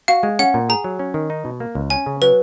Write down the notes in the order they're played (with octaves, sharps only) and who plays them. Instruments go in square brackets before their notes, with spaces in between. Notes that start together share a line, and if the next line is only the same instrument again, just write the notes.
[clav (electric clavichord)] F#4 [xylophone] F5
[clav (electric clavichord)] G#3
[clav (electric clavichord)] C#4 [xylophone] F#5
[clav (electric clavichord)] A#2
[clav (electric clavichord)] G#4 [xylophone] A#5
[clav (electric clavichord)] F#3
C#4
D#3
D#4
B2
A#3
C#2
[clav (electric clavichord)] C#4 [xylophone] G#5
[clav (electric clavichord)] C#3
[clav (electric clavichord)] F#3 [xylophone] B4